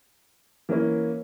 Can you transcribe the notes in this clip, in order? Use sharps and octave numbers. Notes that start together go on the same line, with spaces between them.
E3 A#3 C#4 E4